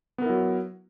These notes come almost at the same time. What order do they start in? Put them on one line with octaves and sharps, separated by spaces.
B3 A#4 E4 F#3